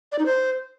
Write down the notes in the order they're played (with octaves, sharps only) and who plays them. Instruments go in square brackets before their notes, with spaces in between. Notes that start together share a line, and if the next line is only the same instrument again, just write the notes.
[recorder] D5
D#4
C5